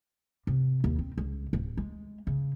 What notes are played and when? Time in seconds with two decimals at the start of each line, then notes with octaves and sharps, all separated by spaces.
0.47 C3
0.84 D#2
0.99 C4
1.18 C#2
1.53 D1
1.77 G#3
2.27 C#3